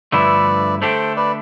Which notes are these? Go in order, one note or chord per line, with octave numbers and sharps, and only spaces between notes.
G2 D3 F3 A3 E4 B4 D5
D3 A3 D4 G4 A4 C5
B4 D5